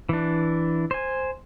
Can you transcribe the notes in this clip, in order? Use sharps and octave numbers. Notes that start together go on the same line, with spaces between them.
E3 D4
C5 G#5